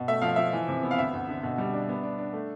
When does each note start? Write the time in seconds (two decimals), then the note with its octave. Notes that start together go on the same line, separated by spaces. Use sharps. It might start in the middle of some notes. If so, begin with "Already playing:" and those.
Already playing: B2
0.08 A3 E5
0.21 F3 F5
0.36 F3 E5
0.53 E3
0.68 C3
0.83 B3
0.91 F5
0.98 D2 E5
1.14 D2
1.29 D3
1.43 B2
1.58 G3
1.73 D4
1.89 B3
2.03 D4
2.18 D4
2.33 A3